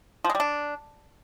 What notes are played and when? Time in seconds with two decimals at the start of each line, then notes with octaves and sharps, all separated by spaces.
0.24 F3
0.30 G#3
0.35 G3
0.40 D4